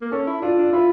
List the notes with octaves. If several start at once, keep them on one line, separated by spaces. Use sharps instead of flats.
A#3
C#4 A4
E4
D4 F4
D4
E4 F4